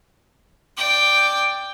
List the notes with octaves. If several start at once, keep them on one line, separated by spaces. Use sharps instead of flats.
D5 G5